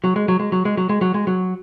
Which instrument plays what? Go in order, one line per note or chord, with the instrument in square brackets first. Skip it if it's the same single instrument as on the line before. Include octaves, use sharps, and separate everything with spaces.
[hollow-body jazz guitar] F#3
G#3
F#3
G#3
F#3
G#3
F#3
G#3
F#3
G#3
F#3